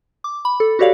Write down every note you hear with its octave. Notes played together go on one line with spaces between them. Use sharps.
D6
B5
A4
F#4 G4 A4 C#5 D5 F5